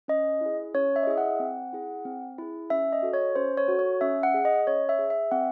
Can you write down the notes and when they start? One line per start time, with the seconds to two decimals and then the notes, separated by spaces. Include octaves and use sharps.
0.08 C#4 D#5
0.41 E4 G#4
0.74 C#4 C#5
0.96 E5
1.03 D#5
1.07 E4 G#4 E5
1.18 F#5
1.40 C4
1.73 E4 G#4
2.05 C4
2.38 E4 G#4
2.70 C#4 E5
2.93 D#5
3.03 F#4 A4
3.14 C#5
3.35 C#4 C5
3.57 C#5
3.68 F#4 A4
3.79 C#5
4.01 C#4 E5
4.23 F#5
4.34 G#4
4.45 D#5
4.67 C#4 C#5
4.89 E5
4.99 G#4
5.10 E5
5.31 C4 F#5